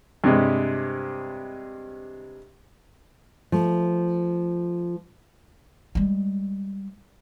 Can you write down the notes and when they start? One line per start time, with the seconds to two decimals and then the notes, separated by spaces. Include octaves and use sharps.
0.24 G2 C3 G#3
3.52 F3 A3
5.95 G3 G#3